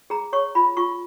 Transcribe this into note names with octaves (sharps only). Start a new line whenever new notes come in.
G#4 A#5
C#5 C#6
F4 B5
F4 C#6